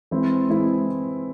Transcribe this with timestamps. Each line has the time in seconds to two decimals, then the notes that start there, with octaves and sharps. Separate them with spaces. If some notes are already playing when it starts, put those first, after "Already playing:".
0.11 E3 G#3 C4 E4
0.49 E3 G#3 C4 E4